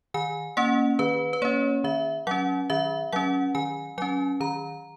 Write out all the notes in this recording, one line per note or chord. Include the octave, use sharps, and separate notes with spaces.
D#3 G#5
A#3 C#4 F#5
D#3 B4
B4
A#3 C#4 C#5
D#3 E5
F#3 C#4 F#5
D#3 E5
F#3 C#4 F#5
D#3 G#5
F#3 C#4 G#5
D#3 A#5